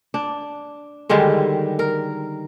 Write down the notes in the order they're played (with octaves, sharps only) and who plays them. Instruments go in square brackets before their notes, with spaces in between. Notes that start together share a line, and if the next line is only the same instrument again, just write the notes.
[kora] D4
D3 D#3 G3 G#3
A#4